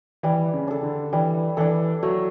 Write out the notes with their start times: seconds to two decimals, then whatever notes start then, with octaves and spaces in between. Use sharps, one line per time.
0.23 E3 G3
0.54 C#3
0.68 D4 A4
0.83 D3
1.13 E3 G3
1.57 E3 D4 A4
2.03 F#3 A3